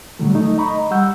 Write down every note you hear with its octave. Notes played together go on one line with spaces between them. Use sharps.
A#2 D3 D#3 F#3 G3 A3
A3 D#4
D#5 A#5 B5 C#6
G3 F#5 E6 G6